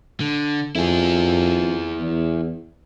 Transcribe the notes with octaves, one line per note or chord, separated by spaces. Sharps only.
D3
F2 E4 G#4
E2